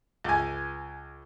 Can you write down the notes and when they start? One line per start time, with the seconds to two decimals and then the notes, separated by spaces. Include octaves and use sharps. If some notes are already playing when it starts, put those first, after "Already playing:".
0.24 C#2 G#5